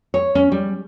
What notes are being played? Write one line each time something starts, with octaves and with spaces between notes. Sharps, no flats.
C#5
C#4
G3